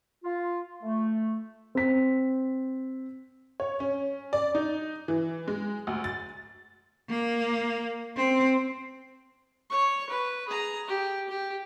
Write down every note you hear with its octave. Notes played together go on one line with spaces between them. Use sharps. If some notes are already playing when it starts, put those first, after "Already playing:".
F4
A3
C4 B6
C#5
C#4
D5
D#4
E3
G#3
D2
A6
A#3
C4
C#5 C#6
B4
G#4 A#5
G4
G4